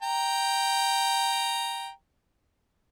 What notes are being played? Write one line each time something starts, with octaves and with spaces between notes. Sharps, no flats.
G5 A#5